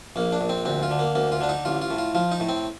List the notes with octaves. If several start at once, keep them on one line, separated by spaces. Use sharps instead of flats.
A#1 A#3
D4
A#1
C4
D2 C4
F4
D3
A#3
D2 A#3
F4
D3 D4
D#4
A1 F4
F4
A2
F4
F3 F4
D#4
A2
C4